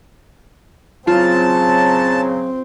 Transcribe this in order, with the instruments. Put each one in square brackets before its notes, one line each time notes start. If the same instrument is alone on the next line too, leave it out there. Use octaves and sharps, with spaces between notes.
[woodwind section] C#3 F#3 [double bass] C4 [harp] F4 [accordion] A5